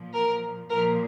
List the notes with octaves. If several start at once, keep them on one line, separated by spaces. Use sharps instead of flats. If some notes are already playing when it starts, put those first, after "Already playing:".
Already playing: A#2 F3
A#4
A#2 F3 A#4